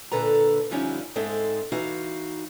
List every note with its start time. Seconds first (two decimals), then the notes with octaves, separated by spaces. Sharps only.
0.12 A#2 D3 A4 B4 A#5
0.71 D3 F3 G3 C#4 D#4 E4
1.15 G#2 G#3 C4 D#4 A4 E5
1.72 E3 D#4 F#4 F5